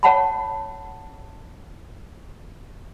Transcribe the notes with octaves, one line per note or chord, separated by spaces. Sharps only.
C#5 F#5 A5 B5